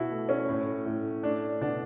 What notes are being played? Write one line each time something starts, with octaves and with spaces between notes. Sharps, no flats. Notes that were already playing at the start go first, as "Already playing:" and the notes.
Already playing: B2 E4 F#4
A3
C#4
A2
A2
A3 D4
B2 D4